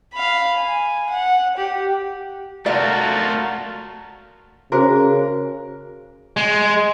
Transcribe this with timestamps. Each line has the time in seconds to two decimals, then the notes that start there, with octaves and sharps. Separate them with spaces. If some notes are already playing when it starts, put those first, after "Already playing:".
0.14 F5 B5
0.58 G#5
1.10 F#5
1.57 G4
2.66 A3 F4 F#4 A#4 D5 F5 A5
4.72 C#3 F#4 G#4 A#4 C5
6.37 G#3